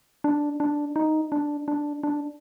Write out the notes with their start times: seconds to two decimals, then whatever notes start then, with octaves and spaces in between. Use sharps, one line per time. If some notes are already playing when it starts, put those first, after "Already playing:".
0.24 D4
0.60 D4
0.96 D#4
1.32 D4
1.68 D4
2.03 D4